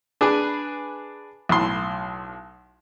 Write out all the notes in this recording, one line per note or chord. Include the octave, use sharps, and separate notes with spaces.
D4 G#4 B4 G#5
B1 A2 C6